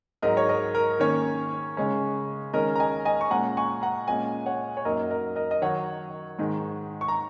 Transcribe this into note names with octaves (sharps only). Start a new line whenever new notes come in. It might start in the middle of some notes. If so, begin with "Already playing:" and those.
G#2 F#3 D#4 A#4 D#5
C#5
A#4 D#5
A#4
D#3 A#3 C#4 C#5
C#3 G#3 C#4
D#3 G#3 C#4 A#4 D#5
A#5
D#5 G#5
D#5 G#5
C#6
A#2 G#3 C#4 F#5 A#5
G#5 C#6
F#5 A#5
A#2 G#3 C#4 D#5 G#5
C#5 F#5
C#5
F#2 F#3 A#3 D#4 A#4 D#5
A#4 D#5
A#4 D#5
D#5
D#3 F#3 D#4 C#5 F#5
G#2 D#3 G#3
C#6
A#5